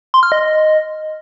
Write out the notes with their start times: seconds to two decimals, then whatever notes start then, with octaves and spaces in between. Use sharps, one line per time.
0.14 C6
0.23 F6
0.32 D#5